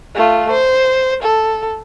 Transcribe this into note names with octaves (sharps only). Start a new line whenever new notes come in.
A3 F4
C5
A4